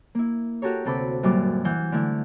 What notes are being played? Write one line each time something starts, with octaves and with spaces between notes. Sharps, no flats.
A#3 E4
F#4 G4 A4 A#4 C#5
D2 C3 A4 B5 D6
F#2 A#2 G3 D6
E3 F#5 G6
D3 A3 E4